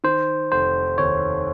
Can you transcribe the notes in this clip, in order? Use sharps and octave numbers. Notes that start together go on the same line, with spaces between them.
D#3 C5
F1 C5
D#2 C#5